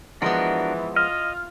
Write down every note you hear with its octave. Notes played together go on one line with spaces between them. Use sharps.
E3 F3 G#3 B3 D4 F#4 A#4
F4 D#5 F6